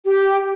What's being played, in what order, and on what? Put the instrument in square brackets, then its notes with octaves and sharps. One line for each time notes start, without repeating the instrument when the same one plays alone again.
[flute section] G4